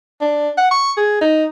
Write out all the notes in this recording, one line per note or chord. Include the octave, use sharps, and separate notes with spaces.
D4
F#5
C#6
G#4
D#4